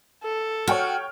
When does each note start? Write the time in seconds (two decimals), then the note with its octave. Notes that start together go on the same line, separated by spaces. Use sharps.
0.23 A4
0.68 F#4 C#5 G5 F6